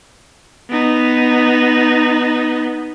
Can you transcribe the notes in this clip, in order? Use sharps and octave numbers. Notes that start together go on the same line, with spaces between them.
B3 D#4